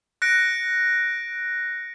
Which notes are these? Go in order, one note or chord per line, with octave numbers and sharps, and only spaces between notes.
F#6 A#6 C#7 D7